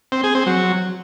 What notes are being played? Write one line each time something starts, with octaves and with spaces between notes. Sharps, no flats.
C4
G#4
C4
F#3